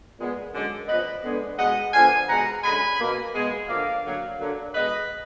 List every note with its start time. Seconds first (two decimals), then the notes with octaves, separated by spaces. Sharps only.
0.17 A#2 G#3 B3
0.52 F#2 D3 G#3
0.87 A#2 F3 B3 B4 D#5
1.23 D3 G#3 B3
1.58 B2 G#3 B3 D#5 F#5
1.93 D3 F3 B3 F5 G#5
2.28 B2 G#3 B3 F#5 A#5
2.63 F#2 D3 G#3 G#5 B5
2.99 B2 A#3
3.33 B2 G#3 B3
3.68 D3 F3 A#3 D5 F5
4.04 D3 F#3 A#3
4.38 D3 F#3 A#3
4.74 B2 G#3 B3 B4 D#5